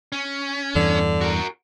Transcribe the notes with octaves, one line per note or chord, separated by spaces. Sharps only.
C#4
E2 G2 D3 E3
F#4 A#4